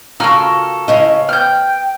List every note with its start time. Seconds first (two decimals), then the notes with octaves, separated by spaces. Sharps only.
0.20 C#3 F4 F#4 A4 A#4 A#5 F6
0.88 C#3 E4 C5 C#5 D#5
1.29 B3 G5 F6 G6